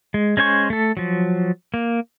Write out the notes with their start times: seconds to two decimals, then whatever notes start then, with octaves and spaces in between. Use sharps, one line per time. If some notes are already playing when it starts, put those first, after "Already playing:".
0.14 G#3
0.37 G#3 C#4 C5 G#5 C#6
0.70 A3 A4
0.97 F3 F#3
1.74 A#3